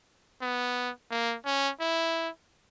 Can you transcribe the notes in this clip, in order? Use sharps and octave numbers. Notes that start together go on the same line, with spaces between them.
B3
A#3
C#4
E4